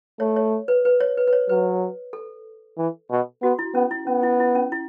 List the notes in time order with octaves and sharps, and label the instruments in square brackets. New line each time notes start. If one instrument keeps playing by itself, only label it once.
[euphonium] A3 [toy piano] C#5
[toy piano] C#5
B4
B4
C#5
B4
B4
C#5
[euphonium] F#3 [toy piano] B4
[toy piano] A4
[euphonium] E3
B2
[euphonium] B3 [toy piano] F#4
[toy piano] E4
[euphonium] B3 [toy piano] C#4
[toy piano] E4
[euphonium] B3 [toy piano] C#4
[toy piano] E4
E4
C#4
E4